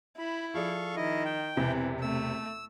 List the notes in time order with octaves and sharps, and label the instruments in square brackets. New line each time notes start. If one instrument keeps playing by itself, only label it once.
[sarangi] E4 [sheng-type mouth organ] B5
[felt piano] F3 G#4 D5 [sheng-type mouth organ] A4 F5 C#6
[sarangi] D#3 [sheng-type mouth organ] E4 D#5
[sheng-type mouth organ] G5
[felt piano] E1 [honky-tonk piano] C3 [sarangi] E3
[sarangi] A3 [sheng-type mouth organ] E6